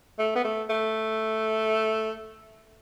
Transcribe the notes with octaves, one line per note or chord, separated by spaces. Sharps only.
A3
B3
A3
A3